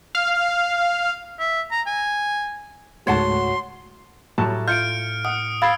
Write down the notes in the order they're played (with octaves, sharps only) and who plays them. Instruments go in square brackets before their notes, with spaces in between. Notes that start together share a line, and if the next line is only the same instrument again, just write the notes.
[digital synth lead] F5
[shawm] E5
A#5
G#5
[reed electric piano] C#2 G#2 A3 [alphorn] F#4 [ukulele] C#5 F#5 A5 [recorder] C6
[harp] A2 [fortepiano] F#3 G3 A5
[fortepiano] F4 [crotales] F6 C#7 D7 [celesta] G6
[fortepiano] F#5 [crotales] D#6
[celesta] F5 B5 A6 [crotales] E6 [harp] G#6 C7 D7